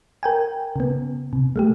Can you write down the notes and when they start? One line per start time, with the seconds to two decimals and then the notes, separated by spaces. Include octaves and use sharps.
0.23 A#4 G5 G#5
0.76 C#3 B3
1.33 C3
1.56 G#3 A3 G4